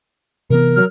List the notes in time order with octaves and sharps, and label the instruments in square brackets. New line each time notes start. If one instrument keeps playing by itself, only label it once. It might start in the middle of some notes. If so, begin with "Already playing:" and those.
[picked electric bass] C3 E3 B3 [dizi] A#4
[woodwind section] F#3 F6